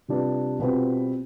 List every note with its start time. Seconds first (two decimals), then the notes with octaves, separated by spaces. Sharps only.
0.08 C3 G3 D4 F4 B4
0.59 B2 G3 C4 F4 B4